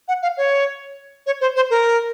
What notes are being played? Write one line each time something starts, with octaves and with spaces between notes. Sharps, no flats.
F#5
F5
C#5
C#5
C5
C5
A#4